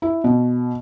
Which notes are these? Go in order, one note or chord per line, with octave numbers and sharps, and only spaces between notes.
E4
B2